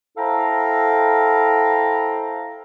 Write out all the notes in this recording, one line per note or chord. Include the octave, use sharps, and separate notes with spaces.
E4 A4 C5 F5 G5 A#5